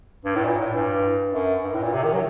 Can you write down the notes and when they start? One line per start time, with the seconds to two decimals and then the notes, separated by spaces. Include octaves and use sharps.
0.25 G2
0.35 A2
0.45 A#2
0.59 A2
0.74 G2
1.34 F#2
1.64 G2
1.74 A2
1.83 A#2
1.93 C3
2.03 D#3
2.13 F#3